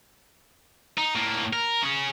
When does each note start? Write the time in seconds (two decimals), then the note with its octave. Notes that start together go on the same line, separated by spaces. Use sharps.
0.98 D#4
1.15 A2 A#3
1.53 A#4
1.83 C#4 G#4